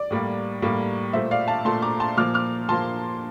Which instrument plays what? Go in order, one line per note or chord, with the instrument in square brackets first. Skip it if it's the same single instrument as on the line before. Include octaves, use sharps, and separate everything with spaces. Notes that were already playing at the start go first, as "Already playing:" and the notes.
Already playing: [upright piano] D5
A2 G3 A#3
A2 G3 A#3
A#2 A3 C5 E5
D5 F5
F5 A5
A#2 A3 A5 C6
A#5 D6
A5 C6
A#2 F3 A#3 D6 F6
D6 F6
A#2 F3 A#3 A5 C6